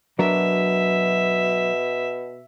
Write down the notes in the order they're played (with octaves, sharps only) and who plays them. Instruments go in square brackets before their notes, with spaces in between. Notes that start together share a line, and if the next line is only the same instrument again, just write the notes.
[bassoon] B2 [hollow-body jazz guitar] F#3 D4 A#4 [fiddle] E5